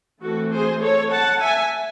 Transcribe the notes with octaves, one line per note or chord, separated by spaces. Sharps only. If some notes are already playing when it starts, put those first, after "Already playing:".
E3 A3 C4 F#4 A4
G#4 C5
A4 C#5
F#5 A5
E5 G#5